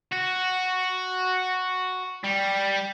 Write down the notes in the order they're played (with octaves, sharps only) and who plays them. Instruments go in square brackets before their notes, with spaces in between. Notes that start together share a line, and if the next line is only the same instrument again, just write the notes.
[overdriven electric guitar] F#4
G3